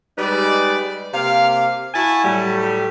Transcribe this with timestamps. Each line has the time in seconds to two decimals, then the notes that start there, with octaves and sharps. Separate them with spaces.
0.18 G3 G#3 D#4 B4 D5
1.14 C3 A#3 F5
1.94 E4 F#4 G#5 A5
2.24 A2 F#3 G3 A3